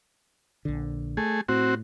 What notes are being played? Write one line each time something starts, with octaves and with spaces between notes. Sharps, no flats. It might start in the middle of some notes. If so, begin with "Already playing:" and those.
A#1 D3
A3 G#4
A2 C4 F#4